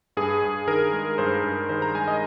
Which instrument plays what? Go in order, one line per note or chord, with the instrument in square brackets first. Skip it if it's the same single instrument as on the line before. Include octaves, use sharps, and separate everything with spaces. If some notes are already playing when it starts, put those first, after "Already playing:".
[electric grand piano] G2 G#4
G2
D#3 A#4
G#3
G2 C5
G2
D#3 C5
A#5
G#3 G#5
D#5